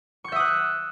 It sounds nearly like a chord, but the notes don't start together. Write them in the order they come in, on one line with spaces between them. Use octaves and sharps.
C#6 G6 E5 D#6 F#6